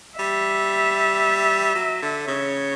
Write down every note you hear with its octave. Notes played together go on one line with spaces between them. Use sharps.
G3 E5
F#3
D3
C#3 C#5